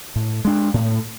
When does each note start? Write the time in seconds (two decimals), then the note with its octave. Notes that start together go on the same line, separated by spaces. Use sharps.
0.16 A2
0.45 G#3 D4
0.74 A2